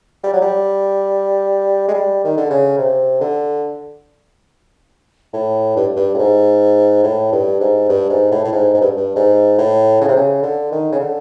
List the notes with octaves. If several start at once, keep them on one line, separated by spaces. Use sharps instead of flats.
G3
F#3
G3
G#3
G3
D#3
D3
C#3
C3
D3
A2
G2
G2
A2
G#2
A2
G2
G#2
G2
G#2
A2
A2
G#2
G#2
G2
G2
G#2
A2
C#3
C3
C#3
D3
D#3
C#3
D3